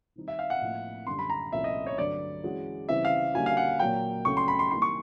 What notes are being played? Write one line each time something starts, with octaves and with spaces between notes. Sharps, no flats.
D#3 G3 C4 D#4
E5
F5
F#5
A2 F3 A#3
F#2 D3 G3 C6
B5
A#5
C2 A#2 F3 A3 C#4 E5
D#5
C#5
G2 D3 F#3 A3 D5
E3 G#3 C#4 F#4
C#3 E3 G3 C4 E5
F5
D3 G3 A#3 C#4 F#4 G#5
F5
F#5
A#2 F#3 A#3 G5
C#2 C#3 F#3 A3 C#6
C6
B5
C6
E3 G3 A#3 D#4 G4 C6
C#6